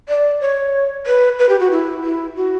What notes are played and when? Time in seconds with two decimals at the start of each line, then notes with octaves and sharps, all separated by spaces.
0.09 D5
0.41 C#5
1.06 B4
1.39 B4
1.49 G4
1.60 F#4
1.71 E4
2.04 E4
2.36 F#4